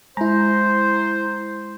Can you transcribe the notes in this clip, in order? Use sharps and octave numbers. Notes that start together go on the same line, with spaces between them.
G#3 E4 C5 A#5